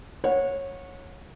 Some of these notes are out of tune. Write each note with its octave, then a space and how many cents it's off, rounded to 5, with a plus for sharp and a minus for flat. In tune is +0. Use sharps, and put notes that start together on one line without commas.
C#5 -15 F#5 -30